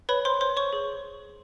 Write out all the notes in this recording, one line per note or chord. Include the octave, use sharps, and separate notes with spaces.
B4 C#5 B5
C5 C6
C5 C#5 C6
C#5 C#6
G#4